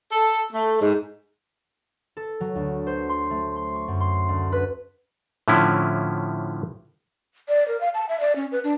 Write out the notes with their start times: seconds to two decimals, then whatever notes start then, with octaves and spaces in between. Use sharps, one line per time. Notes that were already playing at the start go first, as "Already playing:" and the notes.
0.11 A4
0.51 A3
0.80 G#2
2.17 A4
2.41 F#3
2.55 D2
2.87 C5
3.09 C6
3.30 A3
3.56 C6
3.76 C#6
3.88 F#2
4.00 C6
4.28 D2
4.52 B4
5.48 A2 D3 F3 C#4 E4
7.49 D5
7.68 A#4
7.81 F5
7.94 A5
8.09 E5
8.20 D5
8.36 C#4
8.52 B4
8.64 D4